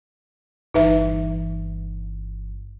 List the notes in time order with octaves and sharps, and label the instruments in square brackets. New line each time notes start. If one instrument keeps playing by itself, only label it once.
[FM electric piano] G1 G2 E3 [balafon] D#4 B4 E5